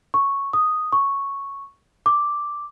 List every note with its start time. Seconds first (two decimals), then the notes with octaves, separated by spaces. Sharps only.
0.14 C#6
0.53 D#6
0.92 C#6
2.06 D6